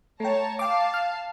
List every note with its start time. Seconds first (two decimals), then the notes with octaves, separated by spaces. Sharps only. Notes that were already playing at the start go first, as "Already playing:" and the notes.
0.20 A3 C#5 G5 A5 A#5
0.59 F5 G5 A5 D6
0.94 F6